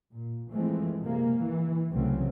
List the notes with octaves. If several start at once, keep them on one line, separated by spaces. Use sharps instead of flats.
A#2
E3 F3 G#3 A3 C4
C3 G#3 A#3
E3
C2 C#3 E3 F#3 A3 C4